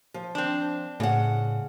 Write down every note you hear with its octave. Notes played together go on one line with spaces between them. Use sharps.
F3
C4 D4
A2 C#3 F#5